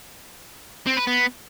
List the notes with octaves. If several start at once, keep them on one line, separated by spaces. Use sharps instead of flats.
C4
B4
B3